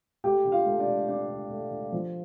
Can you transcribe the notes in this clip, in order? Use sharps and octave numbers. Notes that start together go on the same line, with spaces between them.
A3 G4 G5
D3
F4 F5
A3
D4 D5
D3
A3 D4 D5
D3
A3
D3
F3